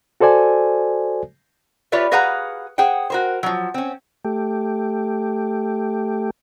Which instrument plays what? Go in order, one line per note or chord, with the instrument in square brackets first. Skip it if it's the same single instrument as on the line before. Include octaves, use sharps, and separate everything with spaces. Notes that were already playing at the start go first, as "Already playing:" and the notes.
[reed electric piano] F#4 A4 C5 D5 G#5
[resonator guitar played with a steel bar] F4 G4 B4 C#5 D5 E5
F#4 G#4 B4 F5 F#5 A#5
G#4 C5 F#5 G5
F#4 A#4 C5
F3 F#3
C4 C#4
[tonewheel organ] A3 G4